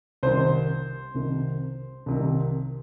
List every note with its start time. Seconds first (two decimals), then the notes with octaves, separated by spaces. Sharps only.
0.23 C2 C3 D#3 C5
1.14 C2 C3 D#3
2.06 C2 C3 D#3